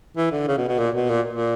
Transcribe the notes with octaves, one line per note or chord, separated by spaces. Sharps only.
E3
D3
C#3
B2
B2
A#2
B2
A#2
A#2